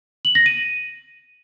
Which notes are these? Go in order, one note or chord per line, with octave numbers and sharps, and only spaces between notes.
F#7
A#6
D#7